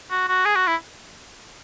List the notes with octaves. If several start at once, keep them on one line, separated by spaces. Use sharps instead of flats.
F#4
F#4
G#4
F#4
E4